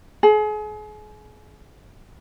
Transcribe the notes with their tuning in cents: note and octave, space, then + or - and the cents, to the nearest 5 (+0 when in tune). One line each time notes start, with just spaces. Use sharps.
G#4 +35